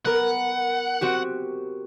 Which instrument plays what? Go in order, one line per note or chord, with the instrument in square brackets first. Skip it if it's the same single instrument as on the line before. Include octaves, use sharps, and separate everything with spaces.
[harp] B3 A#4 [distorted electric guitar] F#5
[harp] C4 F#4 G4